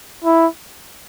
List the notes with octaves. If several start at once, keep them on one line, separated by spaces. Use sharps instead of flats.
E4